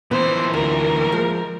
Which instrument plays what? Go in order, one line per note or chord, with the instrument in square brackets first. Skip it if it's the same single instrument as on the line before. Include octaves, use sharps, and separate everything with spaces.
[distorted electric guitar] A#2 E3 [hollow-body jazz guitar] B3 [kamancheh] C5
[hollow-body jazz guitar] D2 [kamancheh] A#4
[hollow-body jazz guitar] F3 G#3